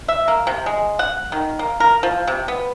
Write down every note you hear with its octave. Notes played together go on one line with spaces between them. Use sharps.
E5
A#3
C3
G#3
F#5
D#3
A#3
A#4
F3
C3
B3